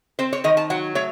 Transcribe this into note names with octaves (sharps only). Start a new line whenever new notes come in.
C4 C5
C#5
D#3 D#5
A5
F#3 F#5
A3 C#5